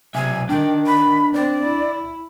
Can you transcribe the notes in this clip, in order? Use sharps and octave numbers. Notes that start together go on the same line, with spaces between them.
B1 C3 E5 G#5
D#3 D4 G5
B5
C4 D5
E4